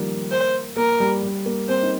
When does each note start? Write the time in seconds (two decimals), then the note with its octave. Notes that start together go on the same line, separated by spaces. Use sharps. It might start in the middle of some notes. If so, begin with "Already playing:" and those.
Already playing: D#3 F3 G3 A#3
0.31 C5
0.77 A#3 A#4
1.00 G3
1.23 G3
1.46 A#3
1.68 C4 C5
1.83 D#4